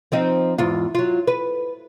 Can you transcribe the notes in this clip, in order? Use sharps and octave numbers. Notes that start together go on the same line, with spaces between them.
F3 C4 D#4
E2 G#2 F4
F#3 F4
B4